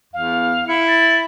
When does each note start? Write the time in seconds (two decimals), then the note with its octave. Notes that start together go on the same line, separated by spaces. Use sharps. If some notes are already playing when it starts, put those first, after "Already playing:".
0.13 E2 F5
0.68 E4 C#7
0.87 A6